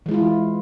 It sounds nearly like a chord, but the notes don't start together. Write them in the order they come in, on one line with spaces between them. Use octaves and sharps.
E3 G#3 E4 F4